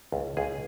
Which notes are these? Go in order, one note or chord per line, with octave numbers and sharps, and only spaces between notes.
C#2
C#2 G#4